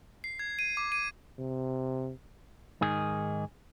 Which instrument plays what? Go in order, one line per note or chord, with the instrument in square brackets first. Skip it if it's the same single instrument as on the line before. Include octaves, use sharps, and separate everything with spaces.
[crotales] C7
G#6
D#7
D6
D#7
[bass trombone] C3
[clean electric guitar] G#2 D#3 G#4